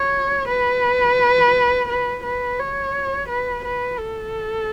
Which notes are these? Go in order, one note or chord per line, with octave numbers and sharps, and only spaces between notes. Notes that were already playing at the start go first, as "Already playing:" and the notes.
Already playing: C#5
B4
B4
B4
C#5
B4
B4
A4